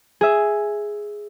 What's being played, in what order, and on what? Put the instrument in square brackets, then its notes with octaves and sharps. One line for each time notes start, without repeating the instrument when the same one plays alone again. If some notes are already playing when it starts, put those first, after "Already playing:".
[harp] G#4 E5